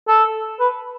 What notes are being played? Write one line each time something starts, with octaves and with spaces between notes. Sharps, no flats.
A4
B4